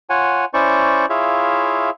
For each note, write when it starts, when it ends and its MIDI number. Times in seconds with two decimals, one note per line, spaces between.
0.10 0.45 65
0.10 0.45 73
0.10 0.45 78
0.10 0.45 80
0.54 1.06 61
0.54 1.06 64
0.54 1.06 72
0.54 1.06 74
0.54 1.06 85
1.10 1.90 64
1.10 1.90 65
1.10 1.90 68
1.10 1.90 73
1.10 1.90 76
1.10 1.90 77